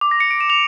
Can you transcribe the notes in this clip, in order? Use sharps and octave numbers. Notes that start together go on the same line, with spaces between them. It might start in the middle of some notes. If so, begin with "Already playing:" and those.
D6
A#6
C#7
D7
E7
F7